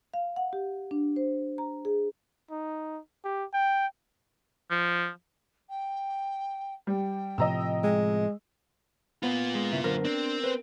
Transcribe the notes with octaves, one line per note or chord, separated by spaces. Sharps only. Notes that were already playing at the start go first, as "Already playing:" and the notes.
F5
F#5
G4
D4
C5
A#5
G#4
D#4
G4
G5
F3
G5
G3 G5
A2 C3 F3 D#5 A#5 E6
G#3
A#3 B3 F4
G#3
G2 C#3 E4
F#2 D3 A#4 C5
C4 D4
B4 C5